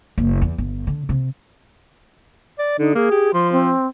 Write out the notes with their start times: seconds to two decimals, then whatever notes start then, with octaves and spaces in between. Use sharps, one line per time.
0.18 F#1
0.41 E2
0.58 G1
0.87 D3
1.09 C3
2.59 D5
2.79 D3 D#4
2.95 A#3 G#4
3.11 G4
3.34 F3 C6
3.52 C4